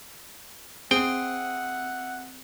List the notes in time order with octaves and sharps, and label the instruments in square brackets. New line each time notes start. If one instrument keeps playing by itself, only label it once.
[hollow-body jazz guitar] C4 [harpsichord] G#4 [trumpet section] E5 F#5 [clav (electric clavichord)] G5